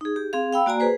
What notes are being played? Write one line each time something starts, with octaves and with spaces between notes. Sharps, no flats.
D#4 G#4
G4
C4 G#4 F5
F5 G5 B5 E6
A#3 F#4 D5 G#5 A#5
G#4 B4 C5